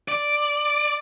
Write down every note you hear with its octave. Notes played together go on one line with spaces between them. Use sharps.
D5